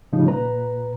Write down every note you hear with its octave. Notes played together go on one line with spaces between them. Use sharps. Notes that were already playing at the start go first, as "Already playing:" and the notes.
A2 C#3 F3 G3 D#4
A#2 B4 A#5